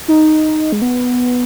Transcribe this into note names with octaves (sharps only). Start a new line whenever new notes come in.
D#4
G#3
B3